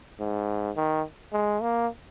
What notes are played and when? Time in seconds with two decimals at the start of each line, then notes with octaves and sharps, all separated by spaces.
0.20 G#2
0.77 D#3
1.33 G#3
1.62 A#3